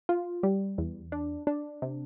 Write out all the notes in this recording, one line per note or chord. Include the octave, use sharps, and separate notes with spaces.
F4
G3
E2
D4
D4
C3